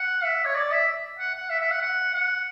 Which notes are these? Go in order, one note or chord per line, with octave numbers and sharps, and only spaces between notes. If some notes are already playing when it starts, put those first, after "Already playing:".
Already playing: F#5
E5
C#5
D5
E5
F#5
F#5
E5
E5
F#5
F#5
F#5